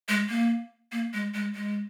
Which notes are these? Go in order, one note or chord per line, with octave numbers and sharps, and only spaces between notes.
G#3
A#3
A#3
G#3
G#3
G#3